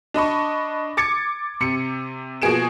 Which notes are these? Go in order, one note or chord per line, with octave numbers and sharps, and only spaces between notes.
D4 D#5 B5 C#6
D6 G#6 A6 C#7
C3 C#7
B2 F3 A#3 G#4 D7 E7